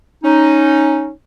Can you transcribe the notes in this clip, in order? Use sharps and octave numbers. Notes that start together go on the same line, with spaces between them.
C#4 D#4